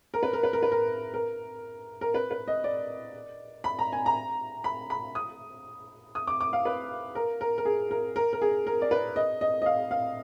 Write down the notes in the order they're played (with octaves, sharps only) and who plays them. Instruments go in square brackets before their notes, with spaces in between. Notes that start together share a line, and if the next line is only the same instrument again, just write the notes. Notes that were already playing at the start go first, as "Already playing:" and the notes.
[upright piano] A#4
B4
A#4
B4
A#4
B4
A#4
A#4
A#4
B4
B4
D#5
D5
B5
A#5
G#5
A#5
B5
B5
D#6
D#6
D6
D6
F5
B4
A#4
A#4
A#4
G#4
A#4
A#4
A#4
G#4
A#4
D5
B4
D#5
D#5
D#5
F5
F5